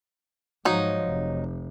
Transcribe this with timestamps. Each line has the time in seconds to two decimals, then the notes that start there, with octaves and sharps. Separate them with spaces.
0.65 G#2 F3 F#3 D#4
1.07 F1